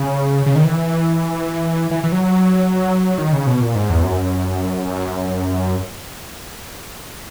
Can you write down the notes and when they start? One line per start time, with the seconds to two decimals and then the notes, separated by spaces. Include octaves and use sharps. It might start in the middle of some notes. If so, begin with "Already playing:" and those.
Already playing: C#3
0.46 C#3
0.55 D#3
0.65 E3
1.91 E3
2.03 E3
2.12 F#3
3.18 D#3
3.33 C#3
3.47 B2
3.60 A#2
3.75 G#2
3.89 E2
4.03 F#2